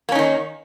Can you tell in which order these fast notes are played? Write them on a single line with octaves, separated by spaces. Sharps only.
A#3 C#4 D#4 D#3